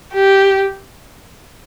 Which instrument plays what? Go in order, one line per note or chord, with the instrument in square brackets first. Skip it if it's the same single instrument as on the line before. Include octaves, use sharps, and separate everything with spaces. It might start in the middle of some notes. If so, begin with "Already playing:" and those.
[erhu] G4